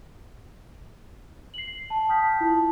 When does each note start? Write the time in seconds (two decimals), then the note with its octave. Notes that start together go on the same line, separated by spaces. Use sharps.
1.54 C7 F#7
1.90 A5
2.08 G5 A5 D#6 F6 G6 B6
2.41 E4 F4 A5